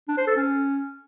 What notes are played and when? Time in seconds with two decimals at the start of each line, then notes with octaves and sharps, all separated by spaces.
0.08 D4
0.18 C5
0.27 A4
0.36 C#4